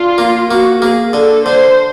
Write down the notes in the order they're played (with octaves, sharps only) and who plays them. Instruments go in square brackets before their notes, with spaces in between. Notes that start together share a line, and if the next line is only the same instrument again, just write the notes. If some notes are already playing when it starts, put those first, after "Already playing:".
Already playing: [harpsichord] D3 [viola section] F4
[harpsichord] A#3
[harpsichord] A#3 [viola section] F#4
[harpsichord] A#3 [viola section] G#4
[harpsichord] D3 [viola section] A4
[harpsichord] D3 [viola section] C5